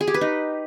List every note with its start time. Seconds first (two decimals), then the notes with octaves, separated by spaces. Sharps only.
0.01 G#4
0.07 G4
0.14 B4
0.21 D#4